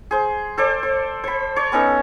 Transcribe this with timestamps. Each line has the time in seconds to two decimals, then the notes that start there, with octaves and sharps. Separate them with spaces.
0.11 G#4 C5
0.58 A4 C5 D5
0.83 C5
1.24 C5 B5
1.56 C#5 D5
1.72 B3 C#4 D#4 A4